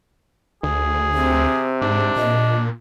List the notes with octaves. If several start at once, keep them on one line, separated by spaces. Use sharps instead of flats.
D2 G#4
C3 C4
G#2 D4
A#2 D#5